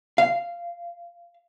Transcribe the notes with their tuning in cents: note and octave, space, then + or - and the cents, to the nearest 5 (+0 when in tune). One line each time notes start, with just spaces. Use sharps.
F5 -15